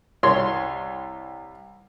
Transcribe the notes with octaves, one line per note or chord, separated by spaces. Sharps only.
C2 C#5 C6